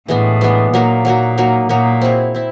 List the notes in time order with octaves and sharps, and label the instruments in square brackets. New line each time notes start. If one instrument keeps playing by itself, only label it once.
[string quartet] A2 [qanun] E3 G#3 B3 D4
[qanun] E3 G#3 B3 D4
[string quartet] A#2 [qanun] F#3 A#3 D#4 F#4
[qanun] F#3 A#3 D#4 F#4
F#3 A#3 D#4 F#4
[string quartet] A#2 [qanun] F#3 A#3 D#4 F#4
[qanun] C4 E4 G#4 C#5
C4 E4